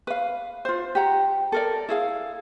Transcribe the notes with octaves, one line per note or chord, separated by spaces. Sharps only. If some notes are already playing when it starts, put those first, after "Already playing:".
B4 F5
F4 C5
G4 F#5 A#5
A4 A#4 D5
E4 G#4 F5